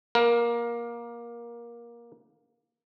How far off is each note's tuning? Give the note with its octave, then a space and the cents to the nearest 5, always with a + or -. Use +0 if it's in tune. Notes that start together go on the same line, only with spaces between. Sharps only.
A#3 +20 A#4 +15